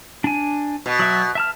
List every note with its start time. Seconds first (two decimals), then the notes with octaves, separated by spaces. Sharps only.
0.24 D4 G#5
0.86 B2
0.99 F#3 E5
1.35 E5 A5 F6